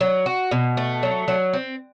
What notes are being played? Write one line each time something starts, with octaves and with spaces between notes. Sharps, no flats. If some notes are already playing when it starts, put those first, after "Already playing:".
F#3
F#4
B2
A3
F#3
F#3
C4